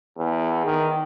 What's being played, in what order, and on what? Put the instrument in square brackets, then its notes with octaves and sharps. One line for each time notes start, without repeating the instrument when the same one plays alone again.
[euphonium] E2
D#3